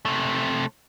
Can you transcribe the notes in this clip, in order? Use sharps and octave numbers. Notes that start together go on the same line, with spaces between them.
C3 A3